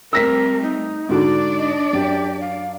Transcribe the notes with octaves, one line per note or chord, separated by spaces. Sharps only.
G3 A3 C4 A#4 E6 A#6 B6
D#4
G#2 D3 D4 F#4 D5
D#5
F#2 G4
F5